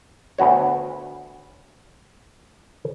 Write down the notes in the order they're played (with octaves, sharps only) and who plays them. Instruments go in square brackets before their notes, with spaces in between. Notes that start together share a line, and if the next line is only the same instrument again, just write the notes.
[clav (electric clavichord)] D2 B3 F#4 C#5